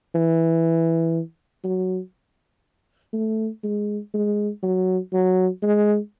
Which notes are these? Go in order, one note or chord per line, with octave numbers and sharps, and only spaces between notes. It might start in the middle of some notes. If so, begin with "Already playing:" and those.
E3
F#3
A3
G#3
G#3
F#3
F#3
G#3